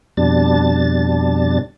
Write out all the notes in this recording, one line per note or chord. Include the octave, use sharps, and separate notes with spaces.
F2 B2 G3 D4 A6